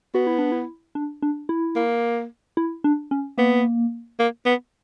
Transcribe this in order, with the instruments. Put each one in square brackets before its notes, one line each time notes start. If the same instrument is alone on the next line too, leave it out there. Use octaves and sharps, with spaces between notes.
[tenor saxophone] B3 [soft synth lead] F#4
[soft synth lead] E4
D4
E4
D4
D4
E4
[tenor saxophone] A#3
[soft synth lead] E4
D4
C#4
[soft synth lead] A#3 [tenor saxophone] B3
[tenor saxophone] A#3
B3